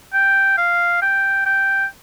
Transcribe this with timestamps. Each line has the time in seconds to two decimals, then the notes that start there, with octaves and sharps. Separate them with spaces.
0.14 G5
0.57 F5
1.02 G5
1.46 G5